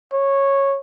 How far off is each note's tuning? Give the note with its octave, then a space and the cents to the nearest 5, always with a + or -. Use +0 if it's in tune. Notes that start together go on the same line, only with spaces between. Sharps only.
C#5 -10